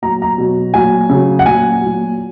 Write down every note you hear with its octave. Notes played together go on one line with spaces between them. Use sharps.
A#2 F#3 A#5
A#5
B2 F#3
A#2 F#3 G#5
C#3 F#3
F#5
A#2 F#3 G#5
A#2 F#3